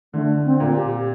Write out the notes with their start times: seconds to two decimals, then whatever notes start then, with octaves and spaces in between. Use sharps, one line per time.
0.13 D3 A3
0.45 C4
0.60 A#2
0.76 G4